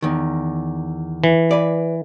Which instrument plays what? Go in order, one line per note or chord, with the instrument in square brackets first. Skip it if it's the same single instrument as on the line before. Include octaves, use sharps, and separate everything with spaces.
[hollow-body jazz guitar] E2 D#3
[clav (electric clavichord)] E3
[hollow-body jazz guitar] B4 D5